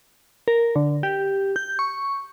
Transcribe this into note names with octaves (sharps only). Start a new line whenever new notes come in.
A#4
D3
G4
G6
C#6